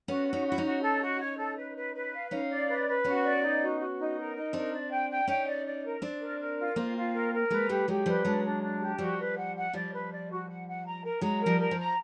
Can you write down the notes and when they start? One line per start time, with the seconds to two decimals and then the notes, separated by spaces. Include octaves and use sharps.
0.08 B3 C#4 F#4
0.27 F#4
0.33 C#4 D#4
0.45 F#4
0.52 E4
0.58 C#4 D#4
0.64 F#4
0.83 A4
1.01 F#4
1.20 C#5
1.38 A4
1.57 B4
1.75 B4
1.94 B4
2.13 F5
2.31 C#4 D#4 F5
2.50 D5
2.68 B4
2.87 B4
3.04 B3 C#4 F#4
3.24 D5
3.43 D#4
3.61 F#4
3.79 F#4
3.98 D#4
4.16 A#4
4.35 D#4
4.53 C4 D4 A#4
4.72 D5
4.91 G5
5.10 G5
5.27 C#4 D#4 G5
5.47 D5
5.65 D5
5.84 A#4
6.02 C4 D4 D5
6.21 A#4
6.39 A#4
6.58 F4
6.76 A#3 C4 F4
6.95 F4
7.13 A#4
7.32 A#4
7.50 G#3 A#3 B4
7.69 G3 A3 G4
7.88 F#3 G#3 G4
8.06 F3 G3 B4
8.25 F#3 G#3 D4
8.43 D4
8.62 D4
8.80 G4
8.98 F3 G3 F#4
9.18 B4
9.36 F#5
9.55 F#5
9.73 F3 G3 D5
9.91 B4
10.11 D5
10.29 F#4
10.48 F#5
10.66 F#5
10.84 A#5
11.03 A#4
11.21 F#3 G#3 A#5
11.40 A#4
11.46 F3 G3
11.59 A#4
11.71 F3
11.77 A#5